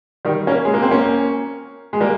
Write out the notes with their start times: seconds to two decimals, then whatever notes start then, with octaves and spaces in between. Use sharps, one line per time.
0.25 D#3 G3
0.47 A#3 C#4
0.65 G#3
0.74 A#3
0.82 C4
0.91 A#3 C#4
1.93 G#3
2.00 G3 A#3